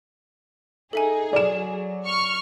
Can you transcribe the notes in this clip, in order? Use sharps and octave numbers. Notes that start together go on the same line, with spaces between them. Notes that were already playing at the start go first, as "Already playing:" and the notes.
D#4 G#4 A4 E5 G#5
F#3 D5 E7
C#6 F6